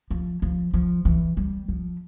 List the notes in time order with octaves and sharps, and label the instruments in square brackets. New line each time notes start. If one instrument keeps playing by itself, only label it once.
[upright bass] F3
F3
F3
E3
G3
F3